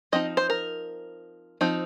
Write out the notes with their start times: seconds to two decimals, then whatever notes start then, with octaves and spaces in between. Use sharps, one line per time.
0.12 F3 C4 D#4 D#5
0.37 C5
0.50 A#4
1.61 F3 C4 D#4